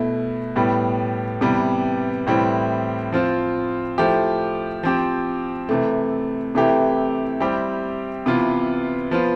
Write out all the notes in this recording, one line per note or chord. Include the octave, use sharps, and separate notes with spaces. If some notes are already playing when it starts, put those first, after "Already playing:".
Already playing: B2 A3 E4
A2 G3 B3
C3 E3 G3 B3
A2 E3 G3 C4 E4
F3 C4 F4
F3 A3 E4 G4
F3 C4 G4
C3 E3 A3
C3 E3 A3 E4 G4
G3 C4 E4 G4
C3 E3 B3 F4
F3 B3 F4